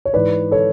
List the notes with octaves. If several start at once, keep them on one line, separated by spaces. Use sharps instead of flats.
C#5
G#2 E3 B4 D5
A4 C#5